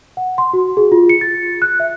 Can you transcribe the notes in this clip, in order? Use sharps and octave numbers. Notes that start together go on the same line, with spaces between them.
F#5
C6
F#4
G#4
F4
C#7
A6
F#6
E5